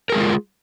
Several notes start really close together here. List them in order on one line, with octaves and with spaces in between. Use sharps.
A#4 G#4 G#3 E4 F4